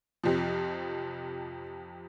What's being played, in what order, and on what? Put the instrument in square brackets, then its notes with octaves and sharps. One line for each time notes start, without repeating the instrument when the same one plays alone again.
[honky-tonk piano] F2 C3 F3